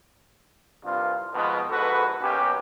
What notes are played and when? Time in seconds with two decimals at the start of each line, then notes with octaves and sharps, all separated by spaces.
0.85 C2 G2 F4
1.33 F2 B2 D#3 F3 G#3 B3
1.70 A#1 G#2 F#4 A4 B4
2.21 B1 B2 A#3 C#4 G4